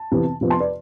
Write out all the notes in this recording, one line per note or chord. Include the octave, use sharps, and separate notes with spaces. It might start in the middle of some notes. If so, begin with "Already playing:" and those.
Already playing: A5
C3 E3 B3
C3 F3 B3
A5 C6
B4 D5